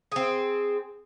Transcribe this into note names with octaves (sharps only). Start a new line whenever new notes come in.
C4 G#4